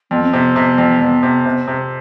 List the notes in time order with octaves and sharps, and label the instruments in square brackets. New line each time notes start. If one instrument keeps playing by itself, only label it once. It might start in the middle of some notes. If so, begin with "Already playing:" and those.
[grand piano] F2 [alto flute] B3
[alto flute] C4
[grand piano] C3 [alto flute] B3
[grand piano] C3
F2
F2
C3
C3
C3